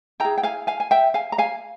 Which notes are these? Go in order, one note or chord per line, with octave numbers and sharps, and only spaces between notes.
E4 G#4 G5 A#5
G5
F5 G#5
F5 G#5
G#5
E5 G5
F5 G#5
A#5
F5 G#5